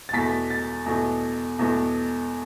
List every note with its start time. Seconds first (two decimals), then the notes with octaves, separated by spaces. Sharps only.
0.09 A6
0.13 E2 B2 A3 B6
0.50 A6
0.86 E2 B2 A3
1.59 E2 B2 A3